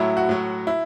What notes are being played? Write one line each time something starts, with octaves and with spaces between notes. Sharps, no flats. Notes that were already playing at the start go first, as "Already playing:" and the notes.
Already playing: A2 F#3 E4
F#4
A2 F#3
E4